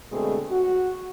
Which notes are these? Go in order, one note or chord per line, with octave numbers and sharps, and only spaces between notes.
B2 D3 G#3 A3 C4 G#4
F#4